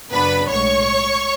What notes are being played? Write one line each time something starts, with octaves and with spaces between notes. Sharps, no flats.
F#2 C#3 F#3 B3 D4 B4 B5
B1 A2 G#3 C#5 C#6